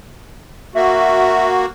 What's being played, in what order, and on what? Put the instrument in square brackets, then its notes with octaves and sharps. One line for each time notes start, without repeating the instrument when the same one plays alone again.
[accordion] A#3 F#4 [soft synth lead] E5